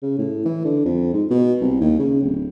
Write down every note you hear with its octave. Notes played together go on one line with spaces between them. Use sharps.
C#3
A2
E3
D3
F2
G#2
B2
C2
D#2
C#3
D1